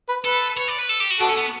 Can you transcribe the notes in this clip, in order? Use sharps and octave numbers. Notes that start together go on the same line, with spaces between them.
B4
A4 B4
C#5
D5
B4
A4
G4
F#4
D4 F#4 A4
C#4
B3